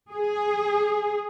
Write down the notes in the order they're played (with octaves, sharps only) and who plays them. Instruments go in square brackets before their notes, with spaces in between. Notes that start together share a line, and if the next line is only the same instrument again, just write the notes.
[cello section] G#4